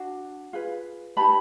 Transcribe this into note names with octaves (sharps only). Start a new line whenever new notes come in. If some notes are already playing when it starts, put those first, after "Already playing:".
Already playing: D4 F#4
F4 G#4 B4
D#4 G4 B4 A5 B5